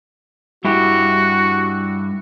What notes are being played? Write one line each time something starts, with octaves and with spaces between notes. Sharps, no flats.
G2 E4 F#4 G4